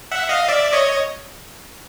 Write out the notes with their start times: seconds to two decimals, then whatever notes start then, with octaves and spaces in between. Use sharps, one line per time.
0.11 E5 F#5
0.29 D#5 F5
0.49 D5 E5
0.73 C#5 D#5